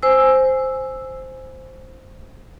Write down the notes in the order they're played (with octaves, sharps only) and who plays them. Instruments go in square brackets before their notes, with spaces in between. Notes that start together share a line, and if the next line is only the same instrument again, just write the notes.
[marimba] C5 G#5 E6